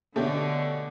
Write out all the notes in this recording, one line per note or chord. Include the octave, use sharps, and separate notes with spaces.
B2 D3 A3 C#4 G4